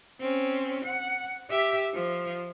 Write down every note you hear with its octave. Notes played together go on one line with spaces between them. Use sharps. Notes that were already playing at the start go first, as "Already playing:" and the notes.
C4 C#4
F#5
G4 E5
F3